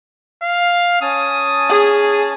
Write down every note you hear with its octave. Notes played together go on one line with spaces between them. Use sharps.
F5
C#4 G#5 A5 D#6
G#4